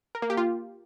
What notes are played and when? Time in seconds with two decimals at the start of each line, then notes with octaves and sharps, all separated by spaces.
0.15 A#4
0.22 A#3
0.30 G4
0.37 F4